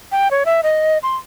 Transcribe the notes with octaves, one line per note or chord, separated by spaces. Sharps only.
G5
C#5
E5
D#5
C6